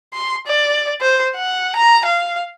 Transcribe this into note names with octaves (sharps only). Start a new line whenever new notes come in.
C6
D5
C5
F#5
A#5
F5